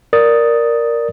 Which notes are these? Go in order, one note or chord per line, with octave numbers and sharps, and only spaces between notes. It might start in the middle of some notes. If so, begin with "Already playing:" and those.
A#4 D5 D#6 A6